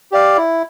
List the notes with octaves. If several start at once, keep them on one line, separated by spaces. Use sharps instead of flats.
G4 D5 F5
E4